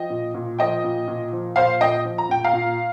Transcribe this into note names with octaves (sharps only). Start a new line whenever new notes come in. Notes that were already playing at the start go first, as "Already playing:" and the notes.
Already playing: F3 D#5 G5
A#2
A#2
F3 D#5 G5
A#2
A#2
F3
A#2 C5 F5
A#2 D#5 G5
F3
A#5
A#2 G5
F5 A#5
A#2